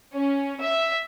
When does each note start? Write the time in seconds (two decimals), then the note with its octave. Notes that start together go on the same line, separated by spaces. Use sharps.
0.14 C#4
0.61 E5